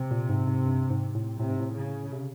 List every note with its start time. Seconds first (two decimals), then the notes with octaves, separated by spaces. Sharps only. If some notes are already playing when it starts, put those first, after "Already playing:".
Already playing: C3
0.11 A#2
0.29 G#2
0.48 G#2
0.66 G2
0.90 G#2
1.15 A2
1.40 A2 C3
1.50 G#2
1.60 A2
1.75 C#3
2.12 C3